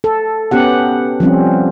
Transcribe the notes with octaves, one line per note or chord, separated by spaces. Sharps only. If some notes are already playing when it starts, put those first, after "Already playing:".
A4
B3 C#4 G4 F#5
F3 G3 C4 C#4